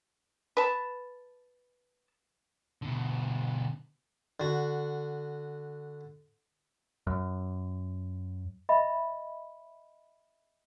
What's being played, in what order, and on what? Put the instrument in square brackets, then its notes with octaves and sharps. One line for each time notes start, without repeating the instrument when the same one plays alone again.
[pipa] B4 A5
[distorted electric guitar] B2 D3
[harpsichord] D3 F#4
[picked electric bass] F#2
[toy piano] D#5 E5 B5